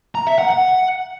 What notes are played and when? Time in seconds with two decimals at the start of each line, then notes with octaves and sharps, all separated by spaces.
0.15 A#5
0.27 E5
0.38 F#5
0.50 F#5